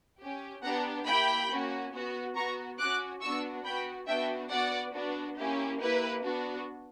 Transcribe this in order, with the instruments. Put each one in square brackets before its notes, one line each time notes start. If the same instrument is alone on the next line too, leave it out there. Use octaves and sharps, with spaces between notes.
[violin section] C#4 G4
B3 D4 G4 F#5 A#5
A#3 E4 G4 G5 B5
A#3 C#4 F#4
B3 F#4
B3 F#4 A#5 C#6
C#4 F#4 D6 F#6
B3 D4 F#4 C#6 E6
B3 F#4 G5 B5
B3 D4 F#4 E5 G5
B3 F#4 D5 F#5
B3 D4 F#4
A#3 C#4 E4 G4
A#3 E4 G4 B4
B3 D4 F#4